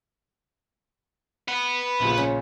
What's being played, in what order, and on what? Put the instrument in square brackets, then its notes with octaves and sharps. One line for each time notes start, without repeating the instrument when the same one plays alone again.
[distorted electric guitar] B4 F#5
[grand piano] A#1 A#2 C#3
[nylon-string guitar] C#4